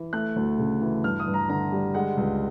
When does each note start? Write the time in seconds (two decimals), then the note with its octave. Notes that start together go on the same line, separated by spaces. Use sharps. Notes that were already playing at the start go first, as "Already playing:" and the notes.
Already playing: E3
0.13 A3 F#6
0.36 D2
0.59 C#3
0.81 E3
1.04 G2 F6
1.20 D#6
1.27 G2
1.34 A#5
1.49 D3 A#5
1.72 G3
1.94 G#3 F#5
2.17 C#2